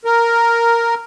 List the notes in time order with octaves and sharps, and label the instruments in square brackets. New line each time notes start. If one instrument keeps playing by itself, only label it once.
[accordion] A#4